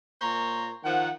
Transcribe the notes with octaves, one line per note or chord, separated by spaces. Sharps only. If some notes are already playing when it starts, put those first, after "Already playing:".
A#2 A#3 C5 C#5 A#5
D#3 F3 F#5